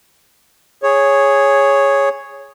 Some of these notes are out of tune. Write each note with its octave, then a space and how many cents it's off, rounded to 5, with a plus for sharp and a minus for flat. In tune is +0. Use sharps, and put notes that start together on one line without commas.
G#4 -5 C#5 +0